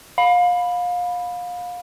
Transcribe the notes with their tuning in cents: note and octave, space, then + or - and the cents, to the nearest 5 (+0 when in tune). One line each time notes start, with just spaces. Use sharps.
F5 +30 B5 +0